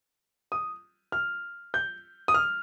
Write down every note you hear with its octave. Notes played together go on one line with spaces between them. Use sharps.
D#6
F6
G6
D#6
F6